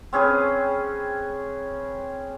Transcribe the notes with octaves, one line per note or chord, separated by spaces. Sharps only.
C4 C#4 G#4 B4